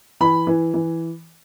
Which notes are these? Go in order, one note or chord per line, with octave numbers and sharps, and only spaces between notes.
E3 B5
E3
E3